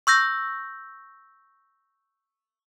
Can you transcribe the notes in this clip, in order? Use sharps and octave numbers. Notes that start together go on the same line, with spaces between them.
C#6 E6 G6 A#6